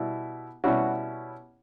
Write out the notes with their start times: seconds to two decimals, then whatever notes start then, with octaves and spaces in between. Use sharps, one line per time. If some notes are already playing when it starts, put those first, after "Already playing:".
Already playing: B2 G3 E4
0.64 B2 G3 C#4 E4 F#4